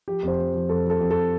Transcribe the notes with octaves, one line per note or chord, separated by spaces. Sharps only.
F3 G4
F2 C5
F3
F3
F2 A4
F3 A4
F2
A4